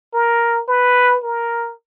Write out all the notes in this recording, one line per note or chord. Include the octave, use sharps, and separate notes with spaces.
A#4
B4
A#4